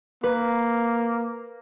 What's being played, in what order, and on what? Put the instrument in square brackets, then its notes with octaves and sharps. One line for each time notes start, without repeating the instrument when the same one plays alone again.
[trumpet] A#3 [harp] B4